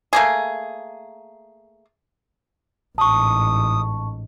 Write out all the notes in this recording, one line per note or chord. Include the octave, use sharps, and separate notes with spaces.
A3 A#3 G#4
A1 G#2 A5 C#6 D#6